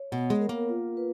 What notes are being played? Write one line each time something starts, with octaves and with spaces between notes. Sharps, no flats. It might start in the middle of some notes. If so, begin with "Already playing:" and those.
Already playing: C#5
B2 B3
G#3
A#4
A#3
F4
B4